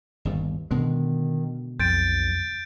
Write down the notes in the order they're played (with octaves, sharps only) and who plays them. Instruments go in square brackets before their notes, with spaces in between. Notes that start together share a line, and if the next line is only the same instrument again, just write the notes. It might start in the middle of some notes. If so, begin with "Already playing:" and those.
[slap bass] G1 D#2
[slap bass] B2 D3 G#3 [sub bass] D#3
[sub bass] B1 [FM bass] F2 [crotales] G6 A6 D7